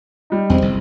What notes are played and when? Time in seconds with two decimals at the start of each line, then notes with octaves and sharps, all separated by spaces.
0.30 G3 D#4
0.50 E2 F#3 G#3 C4
0.61 F#1 C2 F2